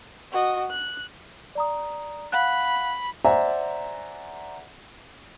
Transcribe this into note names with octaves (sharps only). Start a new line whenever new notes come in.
F#4 D#5
F#6
D5 A#5 D#6
F5 F#5 B5 F#6
C5 D5 E5 F#5 G#5 A#5